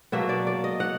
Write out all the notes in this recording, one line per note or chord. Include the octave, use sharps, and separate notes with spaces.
B2 F#3 A#3 E5
D5
D5
D#5
F#5